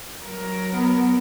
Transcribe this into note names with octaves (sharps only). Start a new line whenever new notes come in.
F#3 A#4
B3